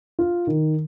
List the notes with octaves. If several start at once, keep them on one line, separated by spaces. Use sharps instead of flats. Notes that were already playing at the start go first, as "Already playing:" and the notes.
F4
D#3